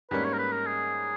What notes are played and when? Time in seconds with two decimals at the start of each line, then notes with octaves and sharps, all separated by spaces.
0.11 G#2 G3 A#3 C#4 B4
0.25 C#5
0.33 A#4
0.39 B4
0.52 A#4
0.66 G#4